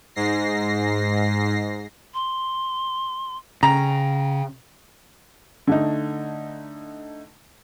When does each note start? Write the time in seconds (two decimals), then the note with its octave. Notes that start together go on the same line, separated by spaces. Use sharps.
0.15 G#2 A#6 C7
2.14 C6
3.63 C#3 G5 A#5
5.67 D3 A3 D#4